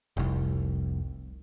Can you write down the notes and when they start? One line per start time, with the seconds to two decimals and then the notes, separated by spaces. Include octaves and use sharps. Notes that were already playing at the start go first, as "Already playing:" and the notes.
0.17 F1 C2